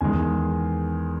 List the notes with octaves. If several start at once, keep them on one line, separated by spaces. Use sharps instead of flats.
E2 D#3 G#3 G#5